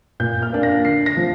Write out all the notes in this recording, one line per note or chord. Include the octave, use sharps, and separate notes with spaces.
A#2 G6
F6
A#3 D4
A#6
D3 C7
A#6
F3